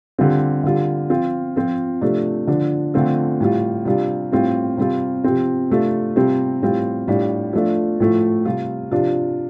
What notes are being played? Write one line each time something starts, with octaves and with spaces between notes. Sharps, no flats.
D3 G3 C4 F4
D3 G3 F4
F3 C4 F4
F3 C4 F4
C3 F3 A3 D4
D3 F3 D4
D3 F3 A3 C4 F4
A2 G3 F4
C3 G3 D4 F4
A2 G3 C4 F4
C3 G3 C4 F4
C3 F3 C4
C3 A3 D4 F4
C3 G3 C4 F4
A2 G3 C4 F4
A2 G3 D4 F4
F3 A3 D4 F4
A2 F3 A3 F4
C3 G3 F4
C3 F3 D4 F4